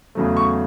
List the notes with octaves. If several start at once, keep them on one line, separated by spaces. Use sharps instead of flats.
E2 C#3 F#3 A3
C#6